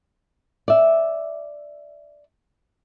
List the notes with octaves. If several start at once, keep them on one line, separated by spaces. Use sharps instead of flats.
D5 E5